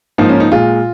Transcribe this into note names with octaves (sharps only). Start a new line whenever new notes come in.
G#2 F3 A#3 D#4
C#4
D#4
A#2 G#3 F4